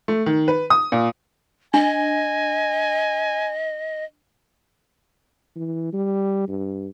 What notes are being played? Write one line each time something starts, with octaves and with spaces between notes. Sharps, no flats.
A3
D#3
B4
D#6
A#2
D4 D#5 G#5
E3
G3
G2